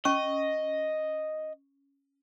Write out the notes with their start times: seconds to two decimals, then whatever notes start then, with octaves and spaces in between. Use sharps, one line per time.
0.05 C#4 D#5 C#6